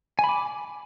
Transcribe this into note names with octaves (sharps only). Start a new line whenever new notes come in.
G#5 B5 D6